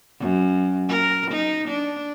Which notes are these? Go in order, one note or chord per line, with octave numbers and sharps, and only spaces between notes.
F#2
A#4
D#4
D4